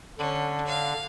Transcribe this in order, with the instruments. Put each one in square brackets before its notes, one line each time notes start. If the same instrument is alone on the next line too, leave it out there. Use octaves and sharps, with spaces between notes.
[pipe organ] D3 [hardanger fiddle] C#4
[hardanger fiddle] F5